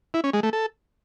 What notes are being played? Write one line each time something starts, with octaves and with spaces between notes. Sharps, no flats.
E4
C#4
G#3
A3
A4